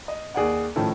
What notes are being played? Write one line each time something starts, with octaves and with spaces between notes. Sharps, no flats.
D#5
D#2 G#4 D5 F#5
A2 D#3 F3 C#4 A4